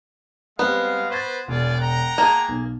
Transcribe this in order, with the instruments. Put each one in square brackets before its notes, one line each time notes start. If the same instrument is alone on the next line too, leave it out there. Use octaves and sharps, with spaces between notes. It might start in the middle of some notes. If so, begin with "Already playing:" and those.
[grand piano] G3 C4 [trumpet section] G#3 F5 [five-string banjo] B3
[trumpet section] B4 C5 [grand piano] C#6 G#6 A6
[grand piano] E1 [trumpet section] F4 G#4 D5
[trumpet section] F#5 G5 A#5
[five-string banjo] A#3 G#4 [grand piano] A5
[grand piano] B1